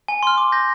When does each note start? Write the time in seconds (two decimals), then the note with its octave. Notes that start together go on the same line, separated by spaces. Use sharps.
0.08 G#5
0.23 C6 F6
0.38 D6
0.52 G6 A#6